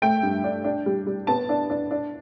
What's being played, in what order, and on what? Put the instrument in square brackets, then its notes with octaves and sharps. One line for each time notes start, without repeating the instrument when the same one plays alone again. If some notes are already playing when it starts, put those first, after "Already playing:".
[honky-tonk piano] A3 G5
G2
D4
D4
G3
G3
B3 A5
D4
D4
D4